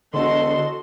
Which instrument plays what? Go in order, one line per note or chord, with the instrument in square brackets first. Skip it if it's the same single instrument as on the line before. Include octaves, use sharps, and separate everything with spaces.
[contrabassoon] E1 [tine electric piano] D3 [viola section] F#4 A4 C6 [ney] D#5